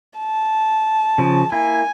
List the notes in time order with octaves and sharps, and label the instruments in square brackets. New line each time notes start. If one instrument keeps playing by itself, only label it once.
[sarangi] A5
[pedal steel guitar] C#3 F3
[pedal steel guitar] A#3 E4 [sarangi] G#5